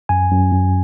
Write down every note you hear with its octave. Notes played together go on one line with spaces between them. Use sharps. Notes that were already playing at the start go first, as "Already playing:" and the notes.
F#2 G#5
F#2
F#2